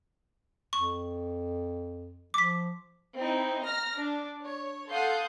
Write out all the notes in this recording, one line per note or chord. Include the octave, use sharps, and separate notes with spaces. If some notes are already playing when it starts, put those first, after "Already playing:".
F2 C#6
F3 D6 B6
C4 D#4 E4
A#5 F6 A#6
D4
C#5
A4 F5 F#5 C6 D#6 G6